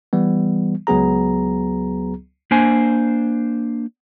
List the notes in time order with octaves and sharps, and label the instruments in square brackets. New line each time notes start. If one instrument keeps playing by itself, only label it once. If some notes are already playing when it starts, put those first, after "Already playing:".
[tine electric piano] E3 G3 B3
C#2 F#3 B3 G#4 A#5
[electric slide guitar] A#3 D4 C5 G#5